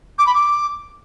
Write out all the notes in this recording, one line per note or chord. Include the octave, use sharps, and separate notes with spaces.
D6
B5
D6